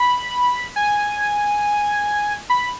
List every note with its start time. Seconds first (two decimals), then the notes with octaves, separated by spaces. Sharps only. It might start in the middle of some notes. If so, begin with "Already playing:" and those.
Already playing: B5
0.76 G#5
2.50 B5